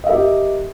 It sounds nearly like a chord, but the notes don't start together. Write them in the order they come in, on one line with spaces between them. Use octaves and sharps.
D#5 E5 A#4 G4